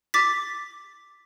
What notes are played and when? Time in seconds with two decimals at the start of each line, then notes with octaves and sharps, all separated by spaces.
0.14 D6 A6 B6